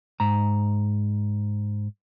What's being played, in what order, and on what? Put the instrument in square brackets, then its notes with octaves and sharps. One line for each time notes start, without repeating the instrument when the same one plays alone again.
[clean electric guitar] G#2 A#5